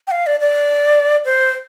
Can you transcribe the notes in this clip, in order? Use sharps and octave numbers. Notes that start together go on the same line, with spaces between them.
G5
F5
D5
D5
C5